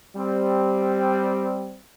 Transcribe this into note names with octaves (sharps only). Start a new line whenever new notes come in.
G3 C4